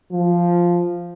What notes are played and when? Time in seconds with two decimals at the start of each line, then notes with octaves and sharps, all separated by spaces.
0.12 F3